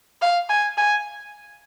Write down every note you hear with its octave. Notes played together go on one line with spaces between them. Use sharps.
F5
G#5
G#5